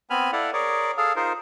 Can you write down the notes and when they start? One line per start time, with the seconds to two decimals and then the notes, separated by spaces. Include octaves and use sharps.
0.10 B3 C4 G#5 B5 F6
0.33 E4 A4 D5 F5 F#5
0.53 G#4 A#4 C#5 D5
0.97 G#4 A4 F5
1.16 D#4 F4 G#4 A#4 C5